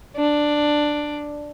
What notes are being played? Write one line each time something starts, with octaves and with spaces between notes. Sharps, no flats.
D4